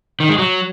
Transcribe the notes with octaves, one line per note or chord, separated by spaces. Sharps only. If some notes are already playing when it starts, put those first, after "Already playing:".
D#3
G#3
F#3